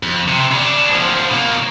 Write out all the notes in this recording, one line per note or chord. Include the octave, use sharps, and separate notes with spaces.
F2
C3
C#3 D4
D2 F3
B2 A#3